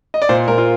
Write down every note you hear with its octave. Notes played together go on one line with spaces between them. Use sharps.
D#5
D5
A#2 C5
A#2 A#4
F4